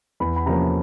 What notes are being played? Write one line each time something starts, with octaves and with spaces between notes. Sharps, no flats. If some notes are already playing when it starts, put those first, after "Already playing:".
E2 B5
B5
C3 F3 A#3 C#4 A#5